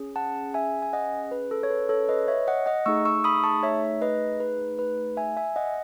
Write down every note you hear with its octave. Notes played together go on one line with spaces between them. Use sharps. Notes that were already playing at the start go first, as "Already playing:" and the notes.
Already playing: C#4 G#4
F#5 A5
E5 G#5
G#5
D#5 F#5
B4
A4
C#5
B4
A4 C#5
B4 D#5
C#5 E5
D#5 F#5
D#5 F#5
A3 D#4 G#4 C#6 E6
C#6 E6
B5 D#6
A5 C#6
C#5 E5
B4 D#5
B4
B4
E5 G#5
E5 G#5
D#5 F#5